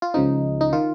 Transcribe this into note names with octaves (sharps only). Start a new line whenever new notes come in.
F4
C#2 C#3 F3 D#4
D#4
D#3 F4